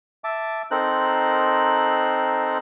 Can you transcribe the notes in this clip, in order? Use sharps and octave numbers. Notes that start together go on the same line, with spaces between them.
E5 A5 D6
C4 D#4 A4 A#4 C5 F#6